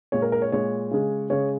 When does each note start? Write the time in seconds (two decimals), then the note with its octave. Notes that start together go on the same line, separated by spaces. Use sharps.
0.12 A#2 G#3 C#5
0.22 A#4
0.32 A#4
0.42 C#5
0.52 A#2 G#3 C#5
0.91 C#3 G#3
1.30 C#3 G#3 C#5